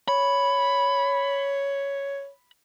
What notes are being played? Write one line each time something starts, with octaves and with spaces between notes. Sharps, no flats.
C#5 B5